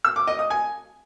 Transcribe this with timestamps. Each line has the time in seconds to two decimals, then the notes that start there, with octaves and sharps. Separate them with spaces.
0.05 E6
0.16 D6
0.27 D#5
0.39 D#6
0.50 G#5